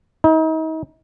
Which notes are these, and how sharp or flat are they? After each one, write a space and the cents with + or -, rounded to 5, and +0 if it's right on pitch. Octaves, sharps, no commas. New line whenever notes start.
D#4 +40